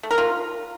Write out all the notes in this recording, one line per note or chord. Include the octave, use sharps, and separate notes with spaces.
A3
A#4
F4